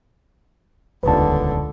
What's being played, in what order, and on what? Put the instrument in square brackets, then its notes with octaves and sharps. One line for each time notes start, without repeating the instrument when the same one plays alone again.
[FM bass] D#1 [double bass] C#2 D3 [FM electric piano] B4 A5